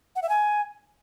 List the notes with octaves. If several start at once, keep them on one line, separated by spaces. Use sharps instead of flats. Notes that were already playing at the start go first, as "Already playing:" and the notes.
F#5
E5
G#5